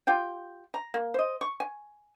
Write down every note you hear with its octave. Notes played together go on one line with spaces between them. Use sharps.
F4 G4 G5
A#5
A#3
C5 D#5
C#6
G#5